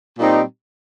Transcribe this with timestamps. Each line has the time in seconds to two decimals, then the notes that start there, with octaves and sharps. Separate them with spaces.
0.19 A#2 G3 C4 D#4 G4